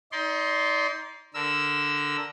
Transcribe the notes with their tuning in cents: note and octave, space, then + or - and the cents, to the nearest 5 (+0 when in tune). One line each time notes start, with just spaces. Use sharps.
D#4 +25 D5 -25 C6 +0
D3 +0 A#4 +0 E6 +0